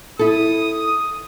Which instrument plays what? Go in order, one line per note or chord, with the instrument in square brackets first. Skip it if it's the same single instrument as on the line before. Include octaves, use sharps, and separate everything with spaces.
[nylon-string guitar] E4 A4 [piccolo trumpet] D#6